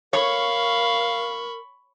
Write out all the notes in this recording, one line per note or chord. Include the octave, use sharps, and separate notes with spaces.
A#4 C#5 F5 B5 C#6